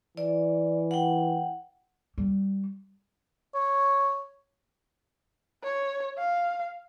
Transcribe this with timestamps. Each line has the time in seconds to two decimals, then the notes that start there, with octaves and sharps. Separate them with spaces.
0.17 E3 D5
0.91 F#5 G5
2.18 G3
3.55 C#5
5.63 C#5
6.18 F5